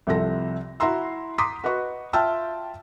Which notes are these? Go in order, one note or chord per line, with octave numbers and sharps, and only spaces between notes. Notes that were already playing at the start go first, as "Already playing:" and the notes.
C2 C3 F3 A4 A#6
E4 F#4 A#5 C6 E6
A#5 C6 D6 D#6 B6
F#4 B4 D#5 C#6
F4 E5 G5 A5 E6 F6